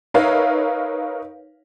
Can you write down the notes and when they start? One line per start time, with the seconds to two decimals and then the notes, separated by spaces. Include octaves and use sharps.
0.14 D#4 A#4 B4 C#5 E5 F5